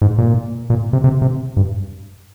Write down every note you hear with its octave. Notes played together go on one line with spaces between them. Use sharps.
G#2
A#2
A#2
C3
C3
C3
G2